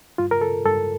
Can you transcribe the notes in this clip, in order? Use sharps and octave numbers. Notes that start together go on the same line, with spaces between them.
G2 F4
A#4
A4
G2 A4